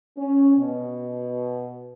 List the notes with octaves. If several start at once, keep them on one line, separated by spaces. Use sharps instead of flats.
C#4
B2